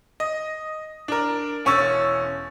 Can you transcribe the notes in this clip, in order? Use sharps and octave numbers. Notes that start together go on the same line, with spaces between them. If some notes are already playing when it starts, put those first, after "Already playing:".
D#5
D4 A#4
E1 C#4 C#6 E6 A6